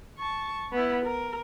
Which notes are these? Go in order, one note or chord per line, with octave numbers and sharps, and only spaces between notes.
A5 C#6
B3 E4
A#4